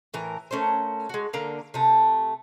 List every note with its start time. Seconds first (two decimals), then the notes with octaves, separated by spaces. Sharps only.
0.14 A2 E3 A#4
0.51 A3 C#4 A#4 C5
1.09 G#3 F#4
1.33 D3 A#3 F5 A#5
1.74 C3 A3